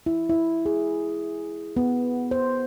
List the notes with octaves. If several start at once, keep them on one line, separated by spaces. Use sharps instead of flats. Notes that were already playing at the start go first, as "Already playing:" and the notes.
E4
E4
G#4
B3
C5